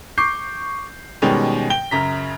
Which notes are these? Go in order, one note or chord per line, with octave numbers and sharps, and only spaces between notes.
C#6 D6 G6 C7
B2 D#3 G3 G#3 C#4
G5 G7
F#2 C#3 A#5 B6